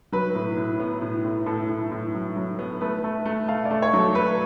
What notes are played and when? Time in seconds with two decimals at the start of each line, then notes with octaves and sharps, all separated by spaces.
0.12 F#3 B4
0.35 A2
0.57 A2
0.80 B3
1.02 A2
1.25 A2
1.46 A2 A4
1.69 A2
1.92 A2
2.14 F#3
2.36 F#3
2.59 B3
2.81 A3 B4
3.04 A3
3.25 A3
3.48 A3 F5
3.65 D5
3.71 A3
3.82 C#5
3.93 F#3
3.99 A4
4.15 A3 B4